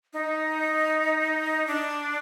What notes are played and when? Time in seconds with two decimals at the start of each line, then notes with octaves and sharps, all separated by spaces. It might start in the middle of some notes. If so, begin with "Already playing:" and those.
0.13 D#4
1.67 D4